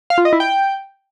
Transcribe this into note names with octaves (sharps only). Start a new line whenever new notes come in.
F5
F4
D#5
E4
G5